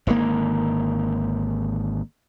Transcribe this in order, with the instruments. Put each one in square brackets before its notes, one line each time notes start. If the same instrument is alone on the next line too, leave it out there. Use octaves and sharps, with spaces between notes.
[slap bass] G#1 D3 D#3 A#3